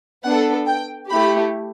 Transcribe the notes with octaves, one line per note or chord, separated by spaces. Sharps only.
B3 D4 A4 F#5
G5
A3 E4 G4 B5